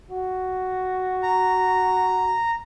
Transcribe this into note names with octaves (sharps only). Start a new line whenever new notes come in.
F#4
A#5